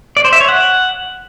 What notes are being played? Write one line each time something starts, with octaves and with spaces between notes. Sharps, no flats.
D5
C5
E5
C#5
F#5